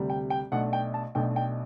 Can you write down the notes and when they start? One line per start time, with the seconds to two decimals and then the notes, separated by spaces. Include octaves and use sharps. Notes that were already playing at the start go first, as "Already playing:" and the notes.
Already playing: D2 C3 G3
0.10 G5
0.30 G5
0.52 B1 B2 A3 D4 F#5
0.73 G5
0.94 A5
1.15 B1 B2 A3 D4 G5
1.36 G5